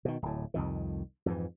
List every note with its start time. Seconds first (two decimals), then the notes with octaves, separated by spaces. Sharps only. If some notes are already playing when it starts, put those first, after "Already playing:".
0.05 B2 D#3
0.22 D1 A2
0.54 C2 F2 D#3
1.26 F2 G#2 E3